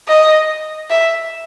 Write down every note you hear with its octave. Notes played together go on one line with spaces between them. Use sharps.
D#5
E5